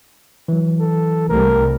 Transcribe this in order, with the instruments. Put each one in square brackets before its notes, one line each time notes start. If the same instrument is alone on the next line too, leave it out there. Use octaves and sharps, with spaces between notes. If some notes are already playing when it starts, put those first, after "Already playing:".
[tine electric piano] E3 F#3
[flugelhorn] A4
[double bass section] C2 G3 A3 [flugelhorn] A#4